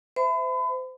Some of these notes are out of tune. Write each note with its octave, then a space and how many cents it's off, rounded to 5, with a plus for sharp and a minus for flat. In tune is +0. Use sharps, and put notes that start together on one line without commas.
C5 -30 E5 +5 B5 +35